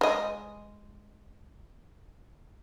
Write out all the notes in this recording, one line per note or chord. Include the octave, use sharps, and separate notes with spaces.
G#3 D#5